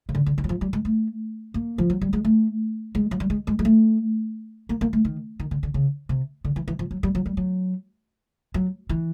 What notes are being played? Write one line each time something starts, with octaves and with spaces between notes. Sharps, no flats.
C#3
D3
D3
D#3
F#3
F3
G3
G#3
A3
A#3
F3
F#3
G3
G#3
A3
G#3
F#3
G3
G#3
G#3
G#3
A3
A#3
A#3
A3
D#3
D#3
D3
D3
C#3
C3
D3
E3
E3
F3
F#3
G3
F#3
G3
F#3
F#3
E3